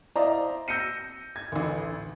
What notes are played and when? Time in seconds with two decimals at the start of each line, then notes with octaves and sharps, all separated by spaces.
0.15 E4 C5 D5 D#5 F5 A#5
0.68 E6 G6 A#6 C#7 D#7
1.36 G#6
1.52 A1 D2